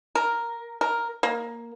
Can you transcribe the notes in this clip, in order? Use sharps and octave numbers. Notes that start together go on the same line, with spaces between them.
A#4
A#4
A#3